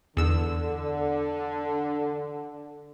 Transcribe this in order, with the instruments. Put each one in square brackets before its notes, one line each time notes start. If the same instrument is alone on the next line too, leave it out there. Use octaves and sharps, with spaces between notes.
[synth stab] E2 E6 [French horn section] D3